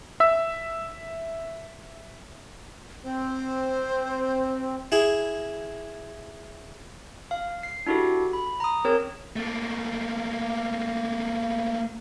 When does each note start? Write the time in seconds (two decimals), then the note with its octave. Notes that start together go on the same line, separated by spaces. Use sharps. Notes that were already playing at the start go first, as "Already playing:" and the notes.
0.20 E5 E6
3.04 C4 C5
4.92 E4 G#4
7.31 F5
7.63 C7
7.87 D4 E4 F#4 G4 A4
8.33 B5
8.60 A#5 D#6
8.84 C4 G#4 A#4 C#5
9.36 A3 A#3